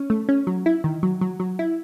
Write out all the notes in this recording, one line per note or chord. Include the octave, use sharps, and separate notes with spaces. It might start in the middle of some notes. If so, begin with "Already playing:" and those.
Already playing: C#4
A3
C#4
F#3
E4
D#3
F#3
F#3
F#3
E4